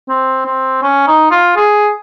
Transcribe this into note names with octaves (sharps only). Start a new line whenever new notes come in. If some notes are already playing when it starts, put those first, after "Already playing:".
C4
C4
C#4
D#4
F4
G#4